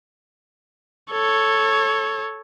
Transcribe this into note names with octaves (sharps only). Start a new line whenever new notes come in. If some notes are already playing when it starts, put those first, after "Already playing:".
A4 C#5